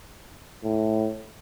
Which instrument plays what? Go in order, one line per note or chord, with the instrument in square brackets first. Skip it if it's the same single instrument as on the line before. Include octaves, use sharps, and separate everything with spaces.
[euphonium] A2